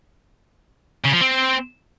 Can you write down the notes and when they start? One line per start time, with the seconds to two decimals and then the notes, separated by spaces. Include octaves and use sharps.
1.05 C#3
1.13 F3
1.21 C4